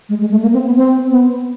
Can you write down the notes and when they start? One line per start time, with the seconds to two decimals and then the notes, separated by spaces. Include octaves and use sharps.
0.09 G#3
0.20 G#3
0.31 A3
0.42 A#3
0.53 C4
0.66 B3
0.76 C4
1.10 B3